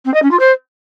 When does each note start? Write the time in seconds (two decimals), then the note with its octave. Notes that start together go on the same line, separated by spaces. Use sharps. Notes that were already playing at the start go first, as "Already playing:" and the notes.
0.05 C4
0.14 D#5
0.23 C#4
0.31 F4
0.40 C5